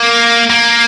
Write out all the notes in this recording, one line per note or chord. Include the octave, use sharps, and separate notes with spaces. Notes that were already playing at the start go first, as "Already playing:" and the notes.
Already playing: A#3
A#3